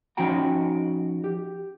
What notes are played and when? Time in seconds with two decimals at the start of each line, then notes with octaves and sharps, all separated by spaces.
0.17 F3 C#4 D#4 F#4 G5 A#5
1.24 G4